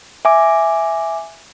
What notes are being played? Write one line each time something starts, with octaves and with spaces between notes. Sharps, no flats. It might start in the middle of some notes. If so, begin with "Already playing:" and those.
E5 G#5 D6